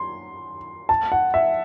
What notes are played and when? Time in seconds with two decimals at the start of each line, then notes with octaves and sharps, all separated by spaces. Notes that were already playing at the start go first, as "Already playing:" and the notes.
Already playing: C6
0.89 A5
1.12 F#5
1.34 E5